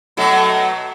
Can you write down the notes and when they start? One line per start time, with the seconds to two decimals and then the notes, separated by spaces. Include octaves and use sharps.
0.17 B2 F#3 A3